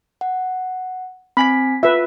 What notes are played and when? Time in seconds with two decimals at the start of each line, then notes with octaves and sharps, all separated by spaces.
0.21 F#5
1.37 C4 G#5 B5 B6
1.83 F4 B4 E5